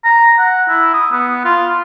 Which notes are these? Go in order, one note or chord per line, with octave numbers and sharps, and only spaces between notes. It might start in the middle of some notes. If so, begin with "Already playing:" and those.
A#5
F#5
E4
D#6
B3
F4